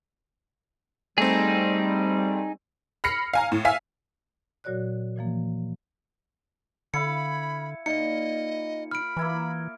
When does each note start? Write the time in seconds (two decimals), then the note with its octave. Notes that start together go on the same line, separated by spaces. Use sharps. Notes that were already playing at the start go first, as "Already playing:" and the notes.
1.18 G3 A3 C4 D#4 G#4
3.04 B5 F6 A#6 C7 C#7
3.33 F5 G#5 A#5
3.52 A2
3.65 E5 F5 G#5
4.64 A#2 F#3 F#4 C#5 D5 F#6
5.16 A#2 E3 F3 A#3
6.94 D3 E4 F5 B5 C#7
7.86 A#2 D#4 D#5 C#7
8.91 B5 F6 D7
9.17 E3 A#3 E4 A#4